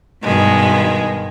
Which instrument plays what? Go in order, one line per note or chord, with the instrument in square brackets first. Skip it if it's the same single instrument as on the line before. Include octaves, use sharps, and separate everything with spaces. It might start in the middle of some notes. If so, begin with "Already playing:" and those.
[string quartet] G2 B2 D#3 G#3